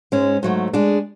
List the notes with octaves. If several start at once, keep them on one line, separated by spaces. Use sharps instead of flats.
G#2 G#3 C#4
G#2 F#3 A3
G#3 D4 G#4